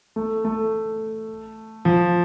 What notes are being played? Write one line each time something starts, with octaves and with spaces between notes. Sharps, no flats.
A3
A3
F3